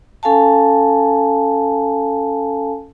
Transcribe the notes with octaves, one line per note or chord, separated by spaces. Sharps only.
C#4 A4 F5 G#5 A5